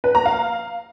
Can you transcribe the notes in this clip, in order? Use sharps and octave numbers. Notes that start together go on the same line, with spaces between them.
B4
A#5
F5